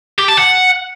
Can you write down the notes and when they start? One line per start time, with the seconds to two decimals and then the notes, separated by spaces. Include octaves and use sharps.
0.18 G4
0.28 A5
0.38 F#5